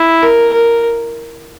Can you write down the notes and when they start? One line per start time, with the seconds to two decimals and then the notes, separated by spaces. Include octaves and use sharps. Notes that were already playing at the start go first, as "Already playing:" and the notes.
Already playing: E4
0.22 A#4
0.53 A#4